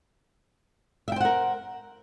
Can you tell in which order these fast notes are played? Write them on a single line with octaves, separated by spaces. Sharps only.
E5 G5 C5 F#5 A#4